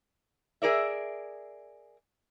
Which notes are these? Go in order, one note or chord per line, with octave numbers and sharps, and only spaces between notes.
G#4 A#4 D5 E5